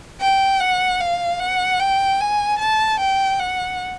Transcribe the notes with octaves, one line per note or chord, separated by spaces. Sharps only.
G5
F#5
F5
F#5
G5
G#5
A5
G5
F#5